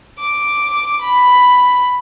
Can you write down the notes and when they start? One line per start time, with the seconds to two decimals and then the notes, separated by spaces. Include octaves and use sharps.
0.19 D6
1.02 B5